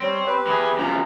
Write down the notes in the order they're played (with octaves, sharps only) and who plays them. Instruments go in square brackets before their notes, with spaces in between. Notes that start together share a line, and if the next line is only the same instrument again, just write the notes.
[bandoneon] G3 [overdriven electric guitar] C4 [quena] C#5
[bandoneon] G4 B4 [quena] B5
[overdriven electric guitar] E3 G#4
[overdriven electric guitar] F#2 C3 [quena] F4 [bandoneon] A#5